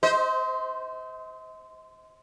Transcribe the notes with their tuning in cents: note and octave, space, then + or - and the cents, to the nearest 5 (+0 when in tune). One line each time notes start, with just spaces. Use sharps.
C5 -20 D#5 +40